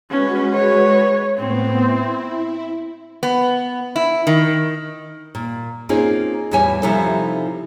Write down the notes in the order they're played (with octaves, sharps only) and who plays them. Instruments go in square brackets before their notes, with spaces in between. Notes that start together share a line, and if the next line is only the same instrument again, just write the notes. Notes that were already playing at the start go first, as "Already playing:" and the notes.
[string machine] G#3 F#4 B4 [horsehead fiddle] C#4
[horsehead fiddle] C#5
[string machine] A2 B3 [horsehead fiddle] C4
[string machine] E4
[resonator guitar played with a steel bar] B3
E4
D#3
[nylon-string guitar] A#2
A#3 C4 C#4 D#4 F4 G#4
E2 A2 G3 E4 C#5 G#5
C3 F3 G3 D#4 E4 A4